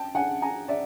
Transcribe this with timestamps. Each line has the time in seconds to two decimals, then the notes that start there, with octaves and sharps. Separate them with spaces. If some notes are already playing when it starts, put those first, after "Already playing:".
Already playing: G5 A5
0.15 F#5 G#5
0.42 G#5 A#5
0.68 D5 E5